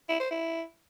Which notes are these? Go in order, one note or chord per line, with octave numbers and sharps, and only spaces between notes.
E4
C5
E4